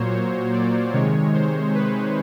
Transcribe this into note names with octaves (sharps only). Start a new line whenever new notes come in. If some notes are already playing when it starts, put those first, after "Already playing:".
Already playing: A#2 F#3 A#3 C5 C#5
C#5
D5
C3 D#3 G#3 C#5
C5
B4